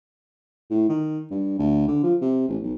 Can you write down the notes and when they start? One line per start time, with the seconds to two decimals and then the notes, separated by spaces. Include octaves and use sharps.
0.70 A2
0.89 D#3
1.31 G2
1.59 D2
1.88 D3
2.03 F3
2.21 C3
2.48 A1
2.62 B1